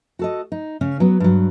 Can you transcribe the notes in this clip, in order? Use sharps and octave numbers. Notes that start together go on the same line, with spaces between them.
F#4 A4 D#5
D#4
C#3 C#4
F#3 B3
G2 F#3